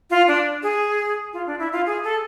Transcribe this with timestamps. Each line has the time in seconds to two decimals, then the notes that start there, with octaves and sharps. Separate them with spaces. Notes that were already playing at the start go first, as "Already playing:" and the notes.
0.10 F4
0.28 D4
0.63 G#4
1.33 F4
1.47 D4
1.59 E4
1.72 F4
1.86 G#4
2.04 A4